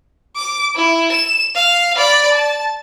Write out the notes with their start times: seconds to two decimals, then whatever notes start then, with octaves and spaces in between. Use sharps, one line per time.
0.36 D6
0.76 E4
1.12 E7
1.55 F5
1.97 D5 B5
2.33 A5